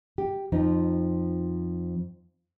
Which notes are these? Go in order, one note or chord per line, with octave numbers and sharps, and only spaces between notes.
G4
F2 F3 D#4